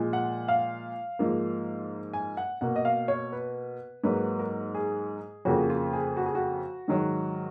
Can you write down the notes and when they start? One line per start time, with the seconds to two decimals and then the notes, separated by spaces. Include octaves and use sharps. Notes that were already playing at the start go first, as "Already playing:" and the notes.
Already playing: A#2 F3 G#3
0.13 F#5
0.48 F5
1.19 G#2 F3 A#3
2.13 G#5
2.37 F#5
2.61 B2 A#3 F#5
2.76 D#5
2.85 F5
3.08 C#5
3.32 B4
4.04 G#2 F#3 A#3 B4
4.39 A#4
4.75 G#4
5.45 F2 C#3 F3 A#3 F#4
5.70 F4
5.93 G#4
6.17 F#4
6.26 G#4
6.35 F#4
6.88 G#2 D#3 F#3